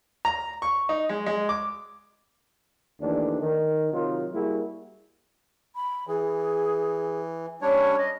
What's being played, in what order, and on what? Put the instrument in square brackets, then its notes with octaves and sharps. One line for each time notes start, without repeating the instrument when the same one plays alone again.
[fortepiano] A#5
C#6
D#4
G#3
G#3
D6
[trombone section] D#2 E3 A3 D4
D#3
C3 D#3 F#3 D#4 F4
G3 A#3 E4 F#4 G#4
[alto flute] B5
[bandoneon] E3 [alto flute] G#4
[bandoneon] G3 D4 C#5 [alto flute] C#4
[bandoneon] D#5